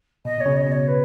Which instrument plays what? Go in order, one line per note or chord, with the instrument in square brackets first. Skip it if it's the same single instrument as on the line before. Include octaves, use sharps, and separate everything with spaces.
[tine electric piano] B2 [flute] D#5
[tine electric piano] B2 [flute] C#5
[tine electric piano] C#3
[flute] D#5
[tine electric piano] B2
[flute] C#5
B4